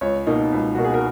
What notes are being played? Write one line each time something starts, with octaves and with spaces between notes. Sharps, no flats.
C#2 C#5
B2 A#3 D#4
C#2
B2 A#3 D#4 F#4
G#4
A#4